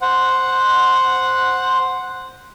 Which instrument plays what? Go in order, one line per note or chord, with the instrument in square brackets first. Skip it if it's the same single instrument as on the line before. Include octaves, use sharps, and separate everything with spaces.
[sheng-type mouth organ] C5 F#5